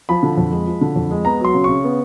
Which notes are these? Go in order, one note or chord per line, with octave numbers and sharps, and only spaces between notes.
F3 B5
D3
F2
G#3
F3
D3
F2
G#3
B3 A#5
F#3 C6
C#3
C#3 C#6
B3